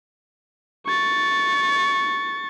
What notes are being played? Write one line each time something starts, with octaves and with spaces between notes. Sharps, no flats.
C#6 A6